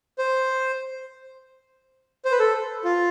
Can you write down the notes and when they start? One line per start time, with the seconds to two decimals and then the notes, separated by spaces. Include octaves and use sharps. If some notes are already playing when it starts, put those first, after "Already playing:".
0.18 C5
2.25 C5
2.32 B4
2.40 A4
2.84 F4